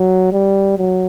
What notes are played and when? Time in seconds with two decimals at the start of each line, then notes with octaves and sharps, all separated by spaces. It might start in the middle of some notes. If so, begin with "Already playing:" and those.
Already playing: F#3
0.32 G3
0.78 F#3